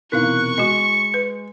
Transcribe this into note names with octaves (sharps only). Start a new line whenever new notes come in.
E1 C3 D#4 E4 A#4 F5 C#6 F#6
G#3 F#4 D#5 C#7
B4